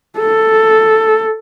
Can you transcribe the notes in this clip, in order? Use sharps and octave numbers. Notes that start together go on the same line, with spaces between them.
A4